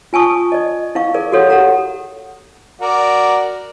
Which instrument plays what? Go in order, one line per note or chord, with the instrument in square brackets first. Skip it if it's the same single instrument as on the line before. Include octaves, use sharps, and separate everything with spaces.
[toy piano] F4 G#5 A5 C#6 D#6
D5 D#5
E4 F5 C#6
G#4 A#4 D5
F#4 G4 A4 C#5 F5 F#5
G4 A4 F#5 A#5
[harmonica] F#4 A#4 D5